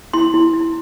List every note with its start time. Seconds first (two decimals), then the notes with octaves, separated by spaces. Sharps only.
0.14 E4 C6
0.34 E4
0.53 E4